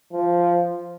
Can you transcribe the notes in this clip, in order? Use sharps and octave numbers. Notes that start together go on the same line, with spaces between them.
F3